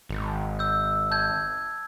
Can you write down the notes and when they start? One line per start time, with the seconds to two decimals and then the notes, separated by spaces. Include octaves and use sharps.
0.09 G#1
0.59 E6 G6
1.11 A5 G6 G#6